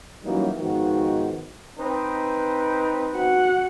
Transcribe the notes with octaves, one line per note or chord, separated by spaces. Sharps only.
E3 F#3 G3 A#3 C#4 D#4
G#2 D#3 F3 B3 F#4
C4 D#4 B4
F#4 F#5